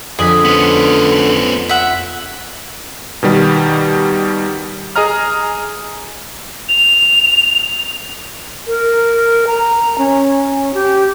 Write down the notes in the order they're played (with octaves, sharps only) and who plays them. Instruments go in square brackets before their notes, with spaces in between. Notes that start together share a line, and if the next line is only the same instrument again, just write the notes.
[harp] F2 B6 [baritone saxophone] D3 [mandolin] G#4 D5 D#5
[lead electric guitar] B3 C#4
[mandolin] E5 F#5
[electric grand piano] B2 D#3 G3
G#4 D#5 A#5 F6
[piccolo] F7
[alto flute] A#4
A#5
C#4
G4